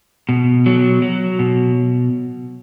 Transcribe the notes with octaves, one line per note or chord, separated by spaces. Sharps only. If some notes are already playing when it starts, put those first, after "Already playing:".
B2
F#3
F#3
B2